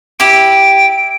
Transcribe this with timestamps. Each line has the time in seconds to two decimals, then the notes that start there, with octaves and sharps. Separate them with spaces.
0.20 E4 G4 D7